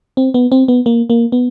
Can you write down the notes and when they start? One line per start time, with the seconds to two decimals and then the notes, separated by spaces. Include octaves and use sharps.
0.17 C4
0.34 B3
0.52 C4
0.68 B3
0.86 A#3
1.10 A#3
1.32 B3